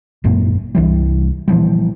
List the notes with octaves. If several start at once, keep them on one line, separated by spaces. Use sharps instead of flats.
G#1 F#2 A#2 A#3
C2 E3 G3
A#2 E3 F3 G3